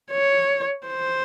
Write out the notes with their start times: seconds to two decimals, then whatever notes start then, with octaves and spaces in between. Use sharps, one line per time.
0.12 C#5
0.87 C5